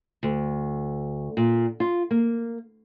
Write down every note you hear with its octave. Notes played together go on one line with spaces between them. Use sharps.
D2
A#2
F4
A#3